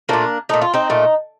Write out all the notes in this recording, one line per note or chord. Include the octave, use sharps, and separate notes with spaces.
A#2 A3 A#3 D4
A#2 A3 D#4
F4
C4 D#4
A#2 A3